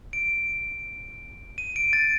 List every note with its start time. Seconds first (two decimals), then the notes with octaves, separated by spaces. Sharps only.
0.13 D7
1.58 D#7
1.76 D7
1.93 A6